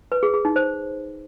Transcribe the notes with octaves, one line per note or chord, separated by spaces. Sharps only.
B4
G#4
G#4
D#4
C5